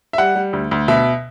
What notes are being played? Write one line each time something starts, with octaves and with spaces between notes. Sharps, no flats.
E5
G3 F#5
G3
D2
D2
B2 E5